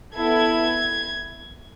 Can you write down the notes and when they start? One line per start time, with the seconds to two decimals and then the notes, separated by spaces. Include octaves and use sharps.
0.15 B3 E4 A4 G#6